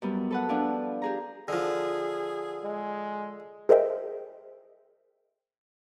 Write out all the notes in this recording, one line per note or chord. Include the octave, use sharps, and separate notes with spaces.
F#2 G3 B3
A4 B4 F#5
F3 B3 D4 E4 F4
G4 G#4 A#5
D3 F3 G#4
G#3
G#4 A#4 C5 D#5 E5 G5